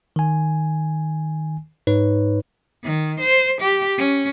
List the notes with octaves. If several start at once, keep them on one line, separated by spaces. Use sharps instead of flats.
D#3 G#5
G#2 D#4 B4 C#5
D#3
C5
G4
C#4